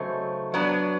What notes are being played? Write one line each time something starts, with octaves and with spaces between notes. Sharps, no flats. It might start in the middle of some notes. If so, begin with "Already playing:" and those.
Already playing: C#3 F#3 A3 C4 D#4
F#3 B3 D4